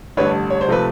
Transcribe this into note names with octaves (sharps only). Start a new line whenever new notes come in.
A1 G2 D3 G3 B4 C#5
C#5
C5
C3 F3 A3 B4